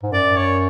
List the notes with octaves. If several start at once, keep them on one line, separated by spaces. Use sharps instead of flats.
G#2
F#2 D5
C#5